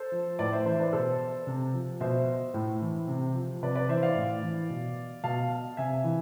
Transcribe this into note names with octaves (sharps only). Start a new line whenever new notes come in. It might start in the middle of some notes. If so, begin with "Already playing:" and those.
Already playing: A4 C5
F3
A2 B4 D5
C5 E5
E3 C5 E5
B4 D5
B2 A4 C5
C3
F3
B2 C5 E5
A2
E3
C3
F3
C3 B4 D5
B4 D5
E3 C5 E5
D5 F5
A2
E3
B2
B2 F5 A5
C3 E5 G#5
E3